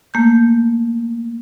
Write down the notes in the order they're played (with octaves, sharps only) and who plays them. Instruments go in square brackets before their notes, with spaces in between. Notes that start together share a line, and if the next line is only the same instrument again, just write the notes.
[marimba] A3 A#3 G6